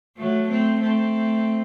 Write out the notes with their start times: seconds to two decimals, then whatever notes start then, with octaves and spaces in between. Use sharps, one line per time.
0.17 F#3 A3
0.49 A3 C4
0.80 A3 C4